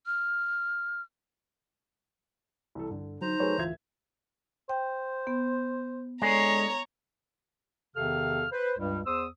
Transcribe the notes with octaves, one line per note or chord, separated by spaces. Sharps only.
F6
C2 E3 A4
G2 D3
F#3 D#4 C5 A#5
F#3 A3 G#4 B4 C#5
D1 E3 F4 E5 G#6
C5 G5
B3
D3 G#3 C#5 G#5 A#5 A#6
E2 C3 D#3 A4 F5 F6
B4 C5
C#2 G2 G3
E2 C5 D#6 E6